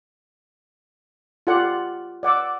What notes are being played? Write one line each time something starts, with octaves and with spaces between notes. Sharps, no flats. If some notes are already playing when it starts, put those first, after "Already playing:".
F4 G4 A4 D5 F#5
D5 F#5 D6 E6